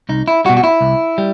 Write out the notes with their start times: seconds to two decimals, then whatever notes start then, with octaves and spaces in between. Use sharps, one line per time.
0.09 C2 D#4
0.28 E4
0.45 G3 F#4
0.49 B2
0.57 F#4
0.64 E4
0.81 C2
1.18 G3